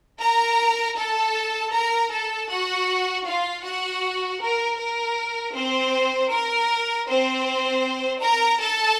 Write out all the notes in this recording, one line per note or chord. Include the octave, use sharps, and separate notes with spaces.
A#4 A#5
A4 A5
A#4 A#5
A4 A5
F#4 F#5
F4 F5
F#4 F#5
A#4
A#4
C4 C5
A#4
C4 C5
A#4 A#5
A4 A5